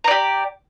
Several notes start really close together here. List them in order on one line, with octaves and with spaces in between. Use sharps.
A#5 D5 G4